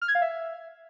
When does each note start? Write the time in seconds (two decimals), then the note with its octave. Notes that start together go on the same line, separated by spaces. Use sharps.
0.02 F6
0.08 G#6
0.15 F5
0.22 E5